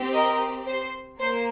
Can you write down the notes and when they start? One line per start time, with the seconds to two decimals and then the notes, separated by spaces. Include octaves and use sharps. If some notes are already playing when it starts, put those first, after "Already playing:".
Already playing: C4 G4
0.13 A#4 D#5
0.67 C5
1.20 A#3 C5